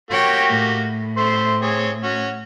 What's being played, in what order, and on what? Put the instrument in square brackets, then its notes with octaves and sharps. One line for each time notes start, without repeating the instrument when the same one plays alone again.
[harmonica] A#3 F#4 G4 [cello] C#5 G5
[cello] A2
[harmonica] A3 C5 C6
C4 G#4 C#5
C#4 F#4